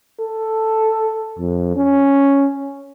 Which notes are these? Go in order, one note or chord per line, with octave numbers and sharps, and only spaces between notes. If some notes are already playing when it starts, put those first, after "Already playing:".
A4
F2
C#4